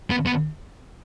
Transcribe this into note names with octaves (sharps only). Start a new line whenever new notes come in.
B3
B3